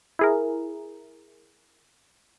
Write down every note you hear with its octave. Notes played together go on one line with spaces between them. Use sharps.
E4 G#4 A#4